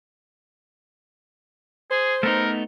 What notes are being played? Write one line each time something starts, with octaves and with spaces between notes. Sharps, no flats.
G#4 C5
A3 B3 D#4 A#4